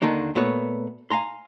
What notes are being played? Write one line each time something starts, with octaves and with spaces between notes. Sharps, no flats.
D#2 D3 D#3 A#3 D4
A#2 A3 B3 F#4 C#5
F5 G#5 A#5 C6